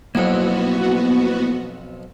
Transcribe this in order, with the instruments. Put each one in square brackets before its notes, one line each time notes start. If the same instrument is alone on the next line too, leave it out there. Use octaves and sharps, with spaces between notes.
[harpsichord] B1 F2 [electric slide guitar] A#3 E4 F#5 [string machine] B3 F#4